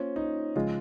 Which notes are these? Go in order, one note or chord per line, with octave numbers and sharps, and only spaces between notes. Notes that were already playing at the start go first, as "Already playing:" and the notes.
Already playing: A#3 C#4 F4 C5
D#4
C#3 F3 G#3 F4